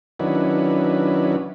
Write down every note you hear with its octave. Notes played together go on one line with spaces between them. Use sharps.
D#3 F#3 C#4 D4 E4 B4